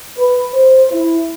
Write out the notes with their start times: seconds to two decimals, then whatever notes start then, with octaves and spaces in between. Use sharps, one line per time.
0.19 B4
0.54 C5
0.92 E4